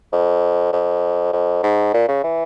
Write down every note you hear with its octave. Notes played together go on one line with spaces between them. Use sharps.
F2
F2
F2
G#2
A#2
C#3
E3